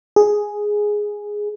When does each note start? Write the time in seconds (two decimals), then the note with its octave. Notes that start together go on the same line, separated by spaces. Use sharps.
0.16 G#4